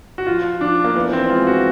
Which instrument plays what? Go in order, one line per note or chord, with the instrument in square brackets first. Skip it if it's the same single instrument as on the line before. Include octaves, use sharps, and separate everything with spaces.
[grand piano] F#4
F3 F4
F3 D4
A#3
E3 B3
C4
G#3 F4
F#4